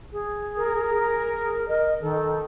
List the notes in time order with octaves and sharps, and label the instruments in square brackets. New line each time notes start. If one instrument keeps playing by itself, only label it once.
[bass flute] G#4
[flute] A#4
[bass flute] G#4
[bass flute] A#4 [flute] D#5
[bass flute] D#3 [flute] A4